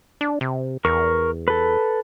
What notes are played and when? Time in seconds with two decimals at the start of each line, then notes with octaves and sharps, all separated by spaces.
0.21 D4
0.41 C3
0.85 E2 A#4 C#6
1.48 A4 B4